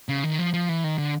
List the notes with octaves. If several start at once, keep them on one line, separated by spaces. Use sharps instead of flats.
C#3
D#3
F3
F3
E3
D#3
D3